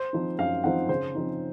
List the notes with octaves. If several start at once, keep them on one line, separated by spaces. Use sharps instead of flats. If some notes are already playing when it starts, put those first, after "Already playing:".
Already playing: C5
F3 C4 D#4
F#2 F5
F3 C4 D#4 F#5
C#3 C5
F3 C4 D#4